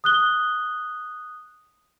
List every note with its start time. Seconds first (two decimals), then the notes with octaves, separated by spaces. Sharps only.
0.04 D#6 F#6 G7